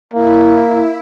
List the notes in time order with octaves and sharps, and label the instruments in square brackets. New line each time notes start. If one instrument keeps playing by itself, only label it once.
[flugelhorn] A#3 [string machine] E4